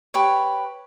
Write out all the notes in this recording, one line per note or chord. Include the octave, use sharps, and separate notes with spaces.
G4 B4 C#5